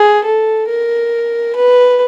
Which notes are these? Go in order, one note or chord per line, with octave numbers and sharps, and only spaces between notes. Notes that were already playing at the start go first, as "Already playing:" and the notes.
Already playing: G#4
A4
A#4
B4